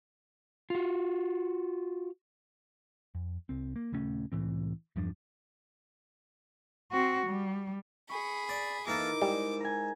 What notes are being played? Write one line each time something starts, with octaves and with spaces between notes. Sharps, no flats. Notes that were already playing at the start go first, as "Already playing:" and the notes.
F4 F#4
F2
C2 C4
A#3
D#1 C#3 A3 C#4
C2 A2 E3 C4
E2 G2 F3 D4
C4 F#4
G3
G#4 B5 C#6
D5
E3 A#3 D#4 E4 A4 A#4 D6
G#2 G3
G#5 A#5